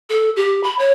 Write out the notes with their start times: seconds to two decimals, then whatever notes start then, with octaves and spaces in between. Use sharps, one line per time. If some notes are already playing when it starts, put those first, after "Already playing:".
0.09 A4
0.36 G4
0.63 B5
0.79 C#5